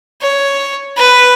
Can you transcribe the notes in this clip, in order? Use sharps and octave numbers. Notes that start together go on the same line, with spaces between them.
C#5
B4